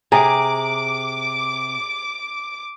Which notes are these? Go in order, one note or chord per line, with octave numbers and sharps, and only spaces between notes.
C3 G#4 A#5 D6